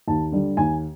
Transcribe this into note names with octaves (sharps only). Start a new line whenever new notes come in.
D#2 A5
D3 G3
D#2 G#5